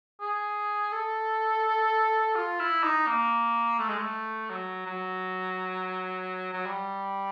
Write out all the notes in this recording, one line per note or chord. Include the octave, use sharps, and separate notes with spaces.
G#4
A4
F4
E4
D#4
A#3
A3
G#3
A3
F#3
F#3
F#3
G3